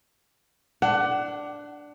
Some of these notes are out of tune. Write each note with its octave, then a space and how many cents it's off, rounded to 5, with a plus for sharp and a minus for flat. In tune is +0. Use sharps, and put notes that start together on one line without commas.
D4 +0 F#5 +25